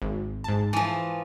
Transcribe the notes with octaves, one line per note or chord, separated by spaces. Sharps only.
G#1
G#2 A5
E3 F3